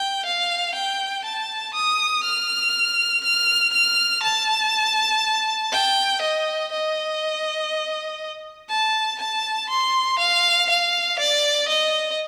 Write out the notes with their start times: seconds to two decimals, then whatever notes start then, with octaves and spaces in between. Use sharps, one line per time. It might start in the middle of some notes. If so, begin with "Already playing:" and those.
Already playing: G5
0.25 F5
0.75 G5
1.24 A5
1.74 D#6
2.23 F6
3.24 F6
3.73 F6
4.23 A5
5.72 G5
6.21 D#5
6.72 D#5
8.70 A5
9.19 A5
9.69 C6
10.19 F5
10.70 F5
11.19 D5
11.68 D#5